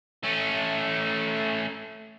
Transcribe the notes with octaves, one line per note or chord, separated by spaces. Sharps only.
A3 C#4